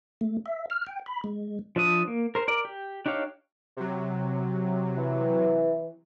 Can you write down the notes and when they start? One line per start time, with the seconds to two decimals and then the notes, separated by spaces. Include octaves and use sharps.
0.21 A3
0.46 E5
0.70 F6
0.87 G5
1.06 B5
1.24 G#3
1.76 F3 D4 E5 D#6
2.08 A#3
2.35 A#4 C5
2.48 A#4 D5
2.65 G4
3.06 D4 D#4 G4 C#5 F5
3.77 C3 F#3
4.98 E3